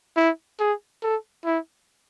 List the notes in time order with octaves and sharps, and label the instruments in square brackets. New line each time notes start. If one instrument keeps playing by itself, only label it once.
[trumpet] E4
G#4
A4
E4